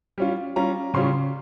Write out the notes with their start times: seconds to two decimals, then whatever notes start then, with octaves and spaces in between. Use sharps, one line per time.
0.18 G3 C#4 F4
0.56 G3 C#4 F4 A#5
0.94 C#3 G3 C#4 F4 C6